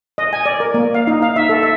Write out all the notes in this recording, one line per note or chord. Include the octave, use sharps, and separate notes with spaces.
D#5
G#5
D5
A#4
A#3
F5
D#4
F5
E5
A4
E5